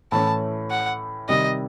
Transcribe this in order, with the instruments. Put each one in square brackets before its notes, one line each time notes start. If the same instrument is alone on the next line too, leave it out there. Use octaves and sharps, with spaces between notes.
[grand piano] A2 E3 A3 C#4 [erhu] A5
[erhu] F#5
[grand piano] C3 D#3 G3 [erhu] D#5